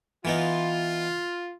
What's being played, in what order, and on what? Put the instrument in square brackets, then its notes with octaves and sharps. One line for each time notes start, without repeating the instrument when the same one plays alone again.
[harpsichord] E3 B3 D#4 [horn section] F4